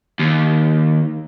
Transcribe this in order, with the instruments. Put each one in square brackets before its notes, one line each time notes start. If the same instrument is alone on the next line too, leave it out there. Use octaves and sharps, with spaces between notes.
[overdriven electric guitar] D#2